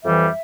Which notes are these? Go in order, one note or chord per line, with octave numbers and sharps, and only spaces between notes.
F2 E3 G3 E5